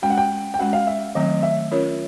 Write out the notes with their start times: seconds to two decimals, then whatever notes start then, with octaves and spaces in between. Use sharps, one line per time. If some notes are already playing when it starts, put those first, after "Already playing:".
0.02 G#3 C#4 F#4 G5
0.10 F#5
0.18 G5
0.54 G5
0.59 G#3 C#4 F#4 F#5
0.73 F5
0.87 E5
1.15 D#3 F#3 A3 C4 D#5
1.43 E5
1.72 C#4 F4 A#4 C#5